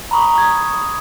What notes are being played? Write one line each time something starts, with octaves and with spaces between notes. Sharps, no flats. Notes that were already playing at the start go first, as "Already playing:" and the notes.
A#5 B5 C#6 D#6
C#6 D#6 G#6
C#6 D#6